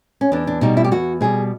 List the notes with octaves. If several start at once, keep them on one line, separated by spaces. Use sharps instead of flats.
C#4
E2 D4
D4
B2 G3 D#4
E4
G4
E2 F#4
B2 G3 G#4